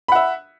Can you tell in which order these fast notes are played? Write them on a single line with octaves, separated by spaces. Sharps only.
B5 F#5 E5